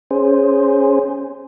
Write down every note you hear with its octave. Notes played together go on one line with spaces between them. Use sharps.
C#4 G#4 C5